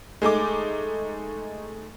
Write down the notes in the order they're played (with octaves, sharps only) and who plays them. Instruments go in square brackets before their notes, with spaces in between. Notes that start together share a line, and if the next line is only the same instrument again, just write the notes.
[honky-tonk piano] G#3 A3 D#4 D6